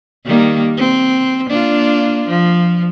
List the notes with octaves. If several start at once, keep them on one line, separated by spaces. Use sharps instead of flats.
D#3 G3 A#3
C4
A#3 D4 F4
F3